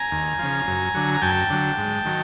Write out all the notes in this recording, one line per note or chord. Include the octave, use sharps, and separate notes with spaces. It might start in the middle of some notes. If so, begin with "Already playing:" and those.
Already playing: G#5 A#5
D#2
C#3 F3
F#2
D3 F#3
A#5
F#2 G5 A5
D3 F#3
G#2
D#3 F#3